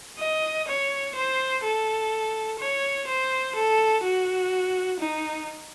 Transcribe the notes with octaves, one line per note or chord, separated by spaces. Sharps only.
D#5
C#5
C5
A4
C#5
C5
A4
F#4
D#4